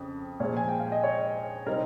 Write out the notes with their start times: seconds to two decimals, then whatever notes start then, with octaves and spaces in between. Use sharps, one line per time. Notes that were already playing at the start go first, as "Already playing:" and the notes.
Already playing: F2 C#3
0.40 A#2 F3 G#3 C#5
0.57 G#5
0.69 G5
0.80 F5
0.92 D#5
1.04 C#5
1.66 C3 G3 C4 D#4 A#4